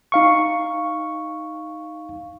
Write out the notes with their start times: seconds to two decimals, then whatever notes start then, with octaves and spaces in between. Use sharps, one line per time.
0.12 D#4 F5 C#6